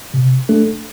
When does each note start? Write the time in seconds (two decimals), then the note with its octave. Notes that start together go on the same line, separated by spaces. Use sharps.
0.14 C3
0.49 A3 D4 A4